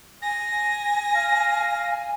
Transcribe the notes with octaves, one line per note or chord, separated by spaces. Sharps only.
G#5 A#6
F5